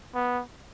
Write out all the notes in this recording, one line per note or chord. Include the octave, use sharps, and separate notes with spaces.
B3